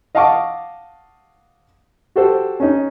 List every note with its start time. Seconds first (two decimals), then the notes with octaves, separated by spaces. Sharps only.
0.15 D#5 F5 F#5 A5 C#6 D6
2.16 F#4 G4 A4 C5
2.60 C#4 D#4